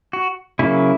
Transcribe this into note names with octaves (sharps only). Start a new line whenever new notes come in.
F#4
C#3 F#3 A#3 E4